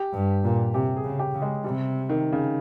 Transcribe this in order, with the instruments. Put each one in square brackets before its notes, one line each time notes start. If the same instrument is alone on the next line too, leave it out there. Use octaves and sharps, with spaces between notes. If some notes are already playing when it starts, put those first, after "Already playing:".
Already playing: [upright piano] G4
[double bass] G2
A#2
[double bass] C3 [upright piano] G4
[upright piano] G#4
[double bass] C#3
[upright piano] G4
[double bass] C#3
[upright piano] G#3
[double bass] C3 [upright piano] G3
[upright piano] D#3
C#3